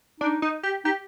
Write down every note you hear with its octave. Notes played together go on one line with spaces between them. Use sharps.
D4 D#4
D#4
G4
D#4 G4